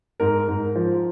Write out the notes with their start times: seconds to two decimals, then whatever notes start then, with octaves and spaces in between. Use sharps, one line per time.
0.20 G#2 A#4
0.48 G#2
0.75 F3